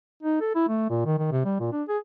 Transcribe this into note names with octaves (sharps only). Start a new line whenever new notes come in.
D#4
A4
E4
A3
A#2
D#3
D#3
C3
G3
A#2
D4
G#4